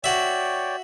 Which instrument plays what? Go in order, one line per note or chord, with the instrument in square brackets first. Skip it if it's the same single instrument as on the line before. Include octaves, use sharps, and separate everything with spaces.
[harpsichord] F#4 E5 [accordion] C#5 D5 G5